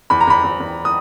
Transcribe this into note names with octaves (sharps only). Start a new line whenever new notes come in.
E2 B5
A#5
E2 B5
E2
E2
D#6